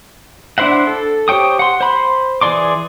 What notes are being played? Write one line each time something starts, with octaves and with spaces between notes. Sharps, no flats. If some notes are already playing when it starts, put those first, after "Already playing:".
D4 E4 C5 E5 F#5
A4
G4 C5 C#5 G5 D#6
F#5 C6
C5 B5 C6
E3 G#4 D5 C6 D6